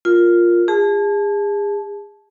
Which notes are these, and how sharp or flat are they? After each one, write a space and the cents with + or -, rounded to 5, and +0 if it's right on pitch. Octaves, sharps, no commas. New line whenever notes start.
F4 +0 A#4 +0
G#4 -35 A5 -20